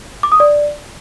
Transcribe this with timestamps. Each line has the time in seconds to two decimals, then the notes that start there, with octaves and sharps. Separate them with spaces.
0.23 D6
0.32 D#6
0.40 D5